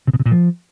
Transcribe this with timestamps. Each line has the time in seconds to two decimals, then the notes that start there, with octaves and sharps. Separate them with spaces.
0.07 C3
0.13 B2
0.20 C3
0.26 A#2
0.32 F3